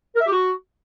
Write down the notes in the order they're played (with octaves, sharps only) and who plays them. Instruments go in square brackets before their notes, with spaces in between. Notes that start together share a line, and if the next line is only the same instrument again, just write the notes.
[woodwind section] A#4
E5
G4
F#4